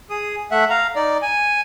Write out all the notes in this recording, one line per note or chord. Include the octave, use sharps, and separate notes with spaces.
G#4 D#6
A3 E5 F#5
F5 A#5
D#4 D5
G#5